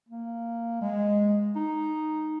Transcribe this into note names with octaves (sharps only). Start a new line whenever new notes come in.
A#3
G#3
D#4